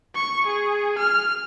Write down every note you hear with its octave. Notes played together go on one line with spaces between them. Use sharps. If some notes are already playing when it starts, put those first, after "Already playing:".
C#6
G#4
F6